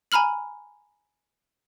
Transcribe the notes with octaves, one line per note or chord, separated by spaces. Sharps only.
G#5 A#5 B5 F6 F#7